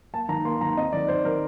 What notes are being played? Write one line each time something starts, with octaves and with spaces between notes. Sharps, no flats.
A#3 A5
D#3 A#5
A#3 C6
D#3 A#5
C4 D#5
D#3 D5
D#3 C5
D#3 A#4